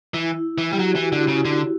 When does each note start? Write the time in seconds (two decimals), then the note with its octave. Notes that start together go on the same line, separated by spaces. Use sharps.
0.13 E3 E4
0.58 E3
0.71 G3 G4
0.79 F#3 F#4
0.96 E3
1.12 D3 E4
1.28 C#3
1.45 D3